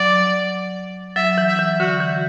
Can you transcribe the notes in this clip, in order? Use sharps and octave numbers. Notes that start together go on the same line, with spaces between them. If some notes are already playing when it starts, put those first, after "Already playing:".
Already playing: F#3 D5
F#3 E5
E3
E5
E3
D3 F#4
E3